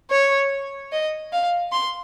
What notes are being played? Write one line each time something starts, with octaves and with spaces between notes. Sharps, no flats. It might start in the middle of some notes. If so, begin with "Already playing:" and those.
C#5
D#5
F5
C6